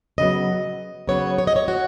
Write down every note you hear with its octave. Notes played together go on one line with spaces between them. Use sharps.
C#3 F#3 B3 D#5
C#3 F#3 B3 C#5
C#5
D#5
C#5
F#4